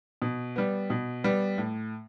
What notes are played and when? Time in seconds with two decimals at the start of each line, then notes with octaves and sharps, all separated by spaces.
0.22 B2
0.56 G3 B3
0.90 B2
1.24 G3 B3
1.58 A2